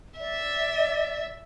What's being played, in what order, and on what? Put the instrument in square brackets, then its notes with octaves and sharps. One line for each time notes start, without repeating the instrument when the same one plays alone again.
[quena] D5 [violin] E5